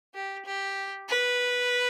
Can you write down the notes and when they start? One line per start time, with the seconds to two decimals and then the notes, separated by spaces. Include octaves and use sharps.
0.14 G4
0.45 G4
1.09 B4